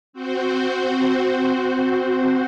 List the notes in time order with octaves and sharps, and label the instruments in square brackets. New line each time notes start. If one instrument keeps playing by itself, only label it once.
[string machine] C4 F#4 C5